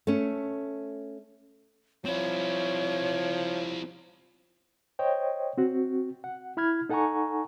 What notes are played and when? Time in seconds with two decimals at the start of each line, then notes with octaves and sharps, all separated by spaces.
0.07 A3 C#4
2.05 F3 C4 E4 C#5
4.99 C5 C#5 D#5 G5
5.58 C4 F#4
6.24 F#5
6.57 E4 B5 F6 G#6
6.89 D#4 A4 F#5 G#5 A#5 C#6